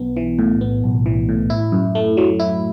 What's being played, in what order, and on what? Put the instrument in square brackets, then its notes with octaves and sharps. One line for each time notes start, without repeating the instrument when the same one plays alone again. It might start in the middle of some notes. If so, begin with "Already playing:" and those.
Already playing: [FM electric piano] B1 B3
E3
A2
B3
B1
E3
A2
E4
F#2
A3
F#3
E4